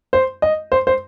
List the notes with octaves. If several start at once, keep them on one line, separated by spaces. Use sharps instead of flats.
C5
D#5
C5
C5